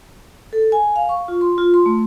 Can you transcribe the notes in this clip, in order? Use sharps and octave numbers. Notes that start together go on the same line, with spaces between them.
A4
G#5
F5
C#6
F4
C6
F4
C6
A3